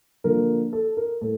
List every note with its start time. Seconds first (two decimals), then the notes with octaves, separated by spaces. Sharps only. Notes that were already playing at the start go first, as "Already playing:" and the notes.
0.24 D3 F3 A#3 A#4
0.73 A4
0.97 A#4
1.21 A2 A4